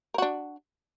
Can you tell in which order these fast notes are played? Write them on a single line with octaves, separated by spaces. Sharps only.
A#4 F#4 D4